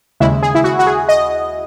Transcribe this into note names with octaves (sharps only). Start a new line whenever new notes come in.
D#2 C#3 G#3 E4
G#4
E4
F#4
F#4
G#4
D#5